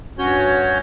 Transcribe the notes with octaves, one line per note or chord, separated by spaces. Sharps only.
G2 C#4 F#4 C#5 G6